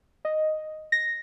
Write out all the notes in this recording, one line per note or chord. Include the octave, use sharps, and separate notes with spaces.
D#5
A#6